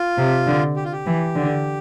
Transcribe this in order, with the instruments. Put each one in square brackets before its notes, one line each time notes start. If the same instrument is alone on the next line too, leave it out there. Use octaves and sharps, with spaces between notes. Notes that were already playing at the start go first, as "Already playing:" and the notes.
Already playing: [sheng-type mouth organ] F4
[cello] C3
D3
[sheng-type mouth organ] G4
F4
G4
[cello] E3
D3